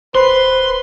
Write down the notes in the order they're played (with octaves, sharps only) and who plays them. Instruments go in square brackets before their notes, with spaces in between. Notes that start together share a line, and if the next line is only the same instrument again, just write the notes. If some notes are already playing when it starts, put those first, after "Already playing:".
[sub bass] D1 [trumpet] B4 [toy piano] C5 [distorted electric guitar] C6